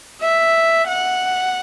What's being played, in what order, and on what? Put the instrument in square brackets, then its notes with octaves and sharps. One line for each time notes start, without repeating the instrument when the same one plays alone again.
[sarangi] E5
F#5